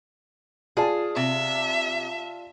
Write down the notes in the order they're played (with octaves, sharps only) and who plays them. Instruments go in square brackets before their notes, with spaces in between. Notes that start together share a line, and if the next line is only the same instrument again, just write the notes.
[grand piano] F4 D5 A5 [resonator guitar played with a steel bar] G#4
[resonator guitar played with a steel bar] C3 [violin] E5